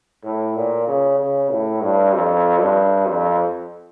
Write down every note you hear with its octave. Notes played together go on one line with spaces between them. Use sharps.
A2
A#2
C#3
C#3
A2
G2
F2
G2
F2